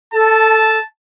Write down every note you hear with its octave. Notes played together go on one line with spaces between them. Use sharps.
A4 A5